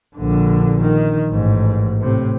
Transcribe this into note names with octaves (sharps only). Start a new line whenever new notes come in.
A#1 D3
D#3
A1 G#2
A2 C3